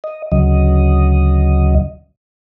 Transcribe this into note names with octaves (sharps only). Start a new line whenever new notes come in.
D#5
D2 C#3 F#3 D#5